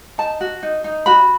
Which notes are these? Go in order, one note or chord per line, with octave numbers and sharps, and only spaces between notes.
D#4 A5
F#4
D#4
D#4
F#4 B5